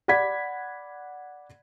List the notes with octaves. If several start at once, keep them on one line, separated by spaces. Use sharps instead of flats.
D5 F#5 B5 G#6 B6